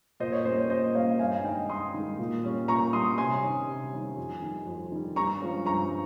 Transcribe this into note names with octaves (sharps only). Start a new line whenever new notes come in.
A#2 C5 D#5
C#5
G3 A#3 C#4 C5 D#5
C#5
A#2 C5 D#5
G3 A#3 C#4 C#5 F5
G2 F5 G#5
G#5
D#3 G#3 D#5 G5
G2 C6 D#6
D#3 G#3
A#2
G3 C#4
A#2 A#5 C#6
G3 C#4 C6 D#6
C3 G#5 C6
D#3 G3 C#4
C3
D#3 G3 C#4
F2
D#3 G3
F2
D#3 G3
G2 A#5 C#6
F3 G#3 C#4
G2 A#5 C#6